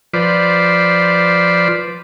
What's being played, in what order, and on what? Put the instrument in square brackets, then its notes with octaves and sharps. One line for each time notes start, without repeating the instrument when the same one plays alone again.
[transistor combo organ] F3 B4 C5 D5